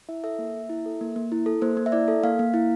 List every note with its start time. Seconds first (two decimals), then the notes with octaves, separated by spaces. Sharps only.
0.09 E4 E5
0.24 A4 E5
0.39 A#3
0.54 A#3
0.69 E4
0.86 A4
1.01 A#3
1.16 A#3
1.32 E4
1.46 A4
1.62 A#3 C5
1.77 A#3
1.86 E5
1.92 E4 D5
2.08 A4
2.23 A#3 F5
2.39 A#3
2.54 E4